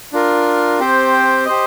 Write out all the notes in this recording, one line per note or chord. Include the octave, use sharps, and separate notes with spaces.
D4 F4 A#4
C4 G4 C5 G5
G4 C5 D#5